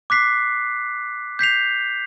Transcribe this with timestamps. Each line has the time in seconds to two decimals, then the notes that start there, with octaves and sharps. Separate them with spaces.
0.10 D6 F#6 B6 C7
1.39 G6 B6 C7 F7